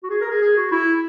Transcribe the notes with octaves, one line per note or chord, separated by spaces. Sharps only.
F#4
G#4
A#4
G#4
G#4
F#4
E4